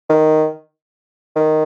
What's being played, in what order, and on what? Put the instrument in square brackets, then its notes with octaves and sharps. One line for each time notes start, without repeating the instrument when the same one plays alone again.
[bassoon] D#3
D#3